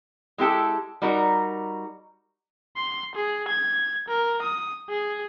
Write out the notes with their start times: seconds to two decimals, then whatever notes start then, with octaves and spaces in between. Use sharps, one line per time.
0.38 G#3 E4 G4 A4
1.02 G3 D#4 F#4 A#4
2.77 C6
3.15 G#4
3.48 G#6
4.08 A#4
4.42 D#6
4.89 G#4